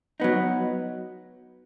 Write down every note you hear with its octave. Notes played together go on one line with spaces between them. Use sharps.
F#3 B3 D#4